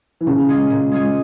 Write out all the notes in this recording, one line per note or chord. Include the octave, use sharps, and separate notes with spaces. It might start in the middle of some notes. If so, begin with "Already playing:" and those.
E3
A#2 C#3
G#3 C#4 F4 G#4
A#2
G#3 C#4 F4 G#4